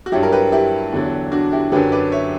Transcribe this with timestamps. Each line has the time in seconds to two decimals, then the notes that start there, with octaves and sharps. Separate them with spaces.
0.06 F#4
0.12 G2 F#3 E4 G4
0.23 A#4
0.32 G4 B4
0.52 E4 G4
0.92 E2 D3 F#3
1.32 D4 F#4
1.52 E4 G4
1.72 F#2 D3 F#3 G4 B4
1.92 B4 D5
2.12 C#5 E5